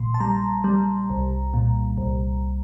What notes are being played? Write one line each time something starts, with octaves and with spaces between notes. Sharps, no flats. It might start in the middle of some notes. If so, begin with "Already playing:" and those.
Already playing: A#1 A#2 C6
A5
G3 A#5
G3
C2
A#2
C2